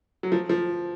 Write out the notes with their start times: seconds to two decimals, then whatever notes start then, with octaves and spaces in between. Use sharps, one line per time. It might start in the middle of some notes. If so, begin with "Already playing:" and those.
0.23 F#3
0.32 F3
0.49 F3